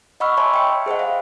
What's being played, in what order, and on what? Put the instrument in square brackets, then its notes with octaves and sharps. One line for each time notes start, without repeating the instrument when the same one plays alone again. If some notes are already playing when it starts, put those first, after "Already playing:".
[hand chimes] D#5 F#5 B5 C#6 E6 F6
C#5 E5 G#5 A5 B5 C6
G5 C#7
G#4 C5 D#5 F#5
F5